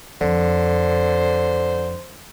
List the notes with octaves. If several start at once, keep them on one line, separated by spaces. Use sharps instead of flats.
F2 D3 C5